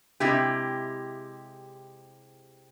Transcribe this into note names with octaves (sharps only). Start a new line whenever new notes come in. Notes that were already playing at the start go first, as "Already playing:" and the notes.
C3 G#3 E4 G4